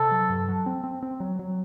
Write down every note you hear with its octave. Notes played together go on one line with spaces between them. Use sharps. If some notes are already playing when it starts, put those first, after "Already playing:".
Already playing: C3 A4
F#3
G2
F#3
C4
C4
C4
F#3
F#3